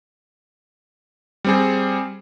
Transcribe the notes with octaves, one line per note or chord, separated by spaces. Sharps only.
G3 C4 G#4